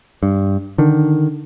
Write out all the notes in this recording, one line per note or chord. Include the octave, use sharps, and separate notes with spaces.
G2
D3 D#3